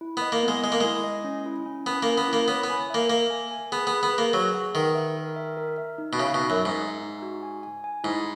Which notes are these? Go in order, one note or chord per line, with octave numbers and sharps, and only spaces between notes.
E4
B3 D#5
A#3
B3
G#3
G#3 D#5
A#3
G#3 E4
D#5
C#4
E4
C#4
B3 C#4
A#3 C#4
B3
A#3 E4
B3 C#5
B3
G#5
A#3 E5
A#3 E5
G#5
G#5
B3 G#4
B3
G#4
B3
A#3 B4
F#3 G#4
F#5
D#3 B4
E5
A#4
E5
A#4
E5
D#4
B2
C#3 E5
B2
D#4
F#2
E5
G#2
E5
D#4
F#4
G#5
G#5
G#5
G#2 E4